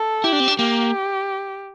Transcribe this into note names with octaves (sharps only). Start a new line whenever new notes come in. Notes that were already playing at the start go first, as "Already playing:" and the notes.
Already playing: A4
E4 G4
D4
C4
D4
A#3 G4